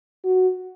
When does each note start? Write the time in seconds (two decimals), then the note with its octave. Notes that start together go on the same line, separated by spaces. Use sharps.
0.24 F#4